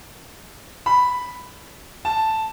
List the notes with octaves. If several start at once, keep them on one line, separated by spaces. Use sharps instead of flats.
B5
A5